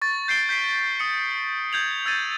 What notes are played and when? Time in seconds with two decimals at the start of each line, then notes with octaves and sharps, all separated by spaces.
0.02 C#6 A6
0.28 G6 C7 D7 G7
0.49 G6 B6 C7 D7
1.00 D#6 C#7
1.72 G6 G#6 F7 F#7
2.06 E6 G#6 A6 D#7